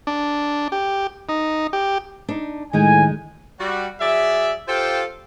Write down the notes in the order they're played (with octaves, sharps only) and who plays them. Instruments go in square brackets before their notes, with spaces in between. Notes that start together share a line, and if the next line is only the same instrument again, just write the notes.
[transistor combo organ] D4
G4
D#4
G4
[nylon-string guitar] D4 D#4
[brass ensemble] A2 G#5 [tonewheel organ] D#3 [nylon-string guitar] G#3 D#4
[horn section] G3 F#4
F#3 G#4 D5 E5
F4 G4 A4 C5 F5 G5